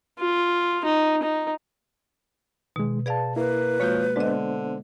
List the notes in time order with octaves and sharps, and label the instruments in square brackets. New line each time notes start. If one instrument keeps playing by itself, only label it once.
[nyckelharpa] F4
D#4
D#4
[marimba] B2 [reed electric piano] D#3 G#3
[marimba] G#4 D5 F5 [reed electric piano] B4 A5
[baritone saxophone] A#3 [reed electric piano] E4 [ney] B4
[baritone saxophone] F3 [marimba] G#3 A#3 F#4 [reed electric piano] C#5 G6
[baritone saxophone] D3 [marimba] G#3 D#5 [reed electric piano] B3 D4 C5